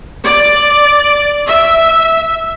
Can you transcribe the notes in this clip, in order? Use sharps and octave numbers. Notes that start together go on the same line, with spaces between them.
D5
E5